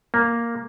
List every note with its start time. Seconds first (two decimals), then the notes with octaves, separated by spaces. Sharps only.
0.14 A#3